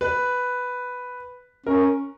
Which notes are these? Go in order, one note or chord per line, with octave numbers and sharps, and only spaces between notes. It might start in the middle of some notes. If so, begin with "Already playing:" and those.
B4
C#4 A#4